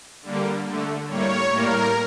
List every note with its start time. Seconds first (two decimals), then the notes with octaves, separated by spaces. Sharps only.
0.22 D3 G3 A#3
0.65 D3 A3
1.07 A2 G3 A#3 C#5
1.50 A2 G3 A#3 A#4